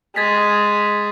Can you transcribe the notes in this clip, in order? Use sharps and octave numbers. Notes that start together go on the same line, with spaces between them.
G#3 G#6 A6 B6